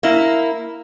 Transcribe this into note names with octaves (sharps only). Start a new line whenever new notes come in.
A#3 E4